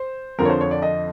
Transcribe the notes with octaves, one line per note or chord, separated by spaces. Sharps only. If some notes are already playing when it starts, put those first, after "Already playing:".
Already playing: C5
F2 D3 F3 A#4
C#5
C5
C#5
D5
D#5